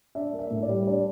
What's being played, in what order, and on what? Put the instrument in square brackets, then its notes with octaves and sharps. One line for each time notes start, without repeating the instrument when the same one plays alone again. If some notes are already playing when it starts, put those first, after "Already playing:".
[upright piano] D4 E5
A#3
E5
A2
D5
G3
D4 D5